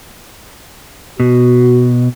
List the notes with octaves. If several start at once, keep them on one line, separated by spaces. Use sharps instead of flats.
B2 F#4